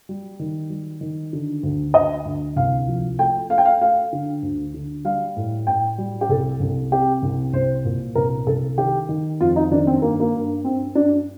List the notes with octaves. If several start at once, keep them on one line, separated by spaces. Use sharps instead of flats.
G3
D#3
G3
D#3
D3
D2
D2 D#5
D2
C2 F5
F3
A3 G5
A3 F5
G5
F5
A3 F5
D3
D2
D3
G3 F5
A2
A2 G5
G3
G4
C2 A4
C2
C3 G4
C2
C2 C5
A#2
C2 A#4
C2 A4
D#3 G4
D#3
F2 F4
D#4
D#3 D4
C4
G2 A#3
A#3
G2
G2 C4
G2 D4